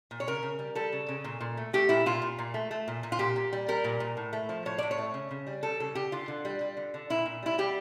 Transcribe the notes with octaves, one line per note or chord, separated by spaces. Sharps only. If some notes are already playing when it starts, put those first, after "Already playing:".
A#2
C#5
C#3 A#4
C#3
G3
G3 A4
C#3
C#3
A#2
A#2
A3
A3 G4
A#2 E4
A#2 F4
A#2
A#2
A3
A3
A#2
A#2
F4
A#2 G4
A#2
G3
G3 A#4
A#2
A#2
A2
A3
F3
A2 C#5
A2 D5
C#5
A3
C#3
C#3
G3
G3 A4
C#3 A4
C#3 G4
D3 F4
D3
G3
G3
D3
D3
A#2 E4
A#2
G3 E4
G3 G4